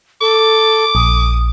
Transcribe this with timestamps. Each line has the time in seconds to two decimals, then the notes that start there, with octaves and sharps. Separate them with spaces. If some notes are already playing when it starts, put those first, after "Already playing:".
0.21 A4 D6
0.95 A#1 D#6